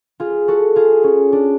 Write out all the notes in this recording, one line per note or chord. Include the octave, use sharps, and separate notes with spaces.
F4 G#4
F#4 A4
F4 G#4
C#4
D4